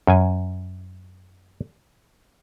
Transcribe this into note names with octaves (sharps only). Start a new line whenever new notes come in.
F#2 G#5